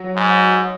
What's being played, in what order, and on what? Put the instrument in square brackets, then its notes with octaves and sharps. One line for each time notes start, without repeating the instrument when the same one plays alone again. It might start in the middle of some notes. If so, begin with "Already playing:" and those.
Already playing: [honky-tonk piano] F#3
[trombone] G#2